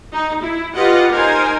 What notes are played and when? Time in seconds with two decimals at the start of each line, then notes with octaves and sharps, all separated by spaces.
0.13 D#4
0.43 E4
0.75 F4 G4 B4 D#5 F#5
1.10 D#4 A#4 C5 G#5